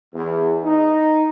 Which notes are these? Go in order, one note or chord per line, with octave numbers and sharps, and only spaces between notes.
E2
D#4